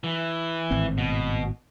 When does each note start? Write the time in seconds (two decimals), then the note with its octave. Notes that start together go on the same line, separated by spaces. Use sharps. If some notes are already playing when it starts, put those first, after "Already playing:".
0.04 E3
0.71 G#1 A2 C4
0.98 B2